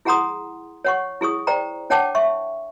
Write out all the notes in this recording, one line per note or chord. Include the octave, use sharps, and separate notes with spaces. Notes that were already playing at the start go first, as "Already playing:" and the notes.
E4 G#4 F#5 A#5 C6 D#6
C#5 F#5 C#6
E4 G#4 C#6 D#6
C5 D5 G5 A#5
D4 C#5 F#5 G5 A5 D6
E5 C#6